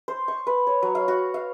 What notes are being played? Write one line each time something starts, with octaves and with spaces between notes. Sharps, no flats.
C5
C#6
B4
C#5
F#3
F5
F#4
F5